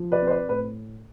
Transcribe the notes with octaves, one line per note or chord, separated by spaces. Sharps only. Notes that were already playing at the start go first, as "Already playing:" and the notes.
Already playing: F3
B4 D5
C4
C5
B4 D5
A2 B4